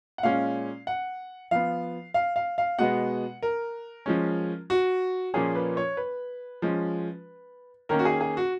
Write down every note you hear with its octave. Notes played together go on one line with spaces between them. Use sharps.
F#5
A#2 G#3 C#4 F5
F#5
F3 B3 F5
F5
F5
F5
B2 G#3 B3 F#5
A#4
F3 G#3 C#4
F#4
A#2 F3 A#3 C#4 G#4
B4
C#5
B4
F3 G#3 C#4
D#3 A#3 C#4 A#4
F#4
G#4
G#4
F#4